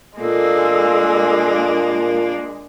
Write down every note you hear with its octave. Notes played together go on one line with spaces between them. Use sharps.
A#2 G#3 A#3 D4 A4